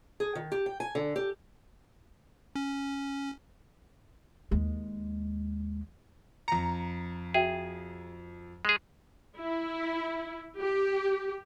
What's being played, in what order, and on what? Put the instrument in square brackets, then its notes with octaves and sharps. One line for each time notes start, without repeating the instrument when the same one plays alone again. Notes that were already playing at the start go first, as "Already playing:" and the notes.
[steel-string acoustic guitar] G#4
D#3
G4
G5
G#5
D3
G4
[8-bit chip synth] C#4
[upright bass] D#2 G#3
[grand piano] F2 C#7 [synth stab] A#5
[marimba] F#4 E5 G5 [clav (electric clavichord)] G#4
[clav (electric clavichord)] G#3 G#4
[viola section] E4
G4